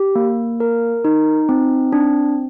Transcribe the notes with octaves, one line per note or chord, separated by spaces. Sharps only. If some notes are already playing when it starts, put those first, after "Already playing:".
Already playing: G4
A#3
A#4
D#4
C4
D4